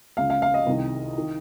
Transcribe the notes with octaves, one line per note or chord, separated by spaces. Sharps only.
C#2 C#3 F5
F5
F5
D#5
C2 C3 D#3
D#3